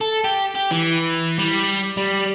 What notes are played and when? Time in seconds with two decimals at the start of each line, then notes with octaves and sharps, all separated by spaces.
0.01 A4
0.24 G4
0.55 G4
0.71 E3
1.38 G3
1.97 G3